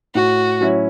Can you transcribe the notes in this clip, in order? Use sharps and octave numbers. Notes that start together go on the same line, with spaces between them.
A2 F#4
F#3 C#4 E4